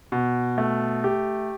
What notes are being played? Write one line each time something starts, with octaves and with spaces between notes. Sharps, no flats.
B2
A3
G4